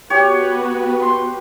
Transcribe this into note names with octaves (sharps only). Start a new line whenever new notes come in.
B3 F#4 G4 B4 C#5
C6